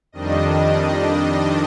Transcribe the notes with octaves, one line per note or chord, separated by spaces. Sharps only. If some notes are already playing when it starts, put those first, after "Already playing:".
F2 D#3 G3 D4 D#5
D#5